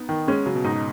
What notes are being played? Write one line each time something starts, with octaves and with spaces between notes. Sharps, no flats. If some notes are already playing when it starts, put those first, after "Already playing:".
Already playing: B3 D#4
D#3
G#3 C#4
C#3 F#3
B2
G#2 D#4
B2